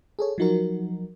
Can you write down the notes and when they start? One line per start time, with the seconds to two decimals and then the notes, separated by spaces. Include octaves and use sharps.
0.19 G#4 A4 C#5
0.38 F3 F#3 D#4 F#4 A#4